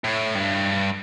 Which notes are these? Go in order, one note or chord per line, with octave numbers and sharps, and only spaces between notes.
A2
G2